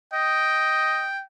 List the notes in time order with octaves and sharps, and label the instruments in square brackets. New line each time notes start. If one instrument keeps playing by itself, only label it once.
[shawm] D#5 [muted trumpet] G5